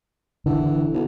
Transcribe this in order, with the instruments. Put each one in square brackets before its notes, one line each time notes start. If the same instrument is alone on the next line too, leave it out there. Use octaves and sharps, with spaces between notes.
[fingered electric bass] D3 [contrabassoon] E3
[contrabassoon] B1